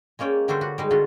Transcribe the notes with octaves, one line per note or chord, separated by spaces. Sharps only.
G#3 A#3 C#4 D5 G5
D3 G3 D4 F#4 A4 C5
F#4 B4
G3 G#3 D#4
D3 F4 F#4